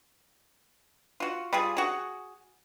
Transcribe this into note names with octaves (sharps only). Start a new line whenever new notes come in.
F4 F#4
G3 F4 G#4
F#4 G#4